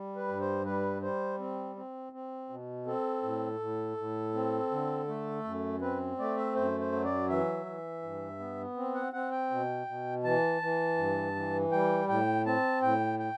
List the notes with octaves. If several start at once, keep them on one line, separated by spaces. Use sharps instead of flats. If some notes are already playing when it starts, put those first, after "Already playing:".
Already playing: G3
B4
G2
C5
G3 B4
G3 C5
C4
C4
C4
B2
C4 A4
A2
A2
A2
C4
D3
A3
F#2
C4 B4
A3 D5
E5
F#2 C5
C5
F#3
D5
E3 E5
E3
G2
B3
C4
F#5
C4 F#5
G5
B2
B2
E3 A5
E3
G2
E3
G3 G5
A2 G5
C4 A5
A2 G5
G5